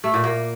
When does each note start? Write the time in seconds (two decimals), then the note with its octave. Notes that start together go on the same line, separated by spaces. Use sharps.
0.04 A3
0.14 A#2
0.24 A#3